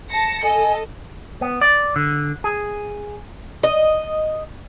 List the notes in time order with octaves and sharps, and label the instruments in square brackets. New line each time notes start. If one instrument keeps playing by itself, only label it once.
[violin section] A5 A#6 C#7
[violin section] A4 D#5 [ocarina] G#5
[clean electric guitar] B3
D5
D3
G#4
[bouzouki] D#5